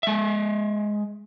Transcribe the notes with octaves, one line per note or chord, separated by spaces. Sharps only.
G#3 E5